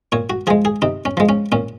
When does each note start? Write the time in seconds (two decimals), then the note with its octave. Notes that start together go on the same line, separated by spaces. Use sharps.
0.12 A#2 C#5
0.30 F#4
0.47 F3 G#3 G#4
0.65 G#4
0.82 C3 D#4
1.05 C#4
1.17 F3 G#3
1.29 C#4
1.52 A#2 C#4